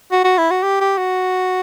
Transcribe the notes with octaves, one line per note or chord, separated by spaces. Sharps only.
F#4
F#4
E4
F#4
G4
G4
F#4